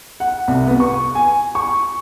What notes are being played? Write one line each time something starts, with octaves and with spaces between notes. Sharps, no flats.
F#5
C2
B3
C#6
G#5
C#6